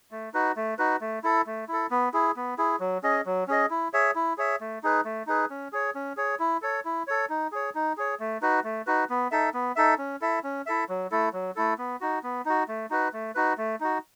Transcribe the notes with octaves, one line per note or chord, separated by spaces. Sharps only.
A3
D#4 F#4 B4
A3
D#4 F#4 B4
A3
E4 A4
A3
E4 A4
B3
E4 G#4
B3
E4 G#4
F#3
C#4 G#4 D#5
F#3
C#4 G#4 D#5
E4
G#4 C#5 E5
E4
G#4 C#5 E5
A3
D#4 G#4 B4
A3
D#4 G#4 B4
C#4
G#4 C#5
C#4
G#4 C#5
E4
A4 C#5
E4
A4 C#5
D#4
G#4 C#5
D#4
G#4 C#5
A3
D#4 F#4 B4
A3
D#4 F#4 B4
B3
D#4 A4 E5
B3
D#4 A4 E5
C#4
E4 A4 E5
C#4
E4 A4 E5
F#3
A3 E4 A4
F#3
A3 E4 A4
B3
D#4 F#4
B3
D#4 F#4
A3
D#4 F#4 B4
A3
D#4 F#4 B4
A3
D#4 F#4